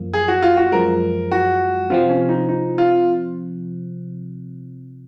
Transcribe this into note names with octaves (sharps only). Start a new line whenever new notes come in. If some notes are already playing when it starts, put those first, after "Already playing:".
Already playing: F#2 F3 A#3
G#4
F#4
F4
F#4
F#2 F3 G#3 A#4
F#4
C3 F3 C4 F4
C#4
D#4
D#4
F4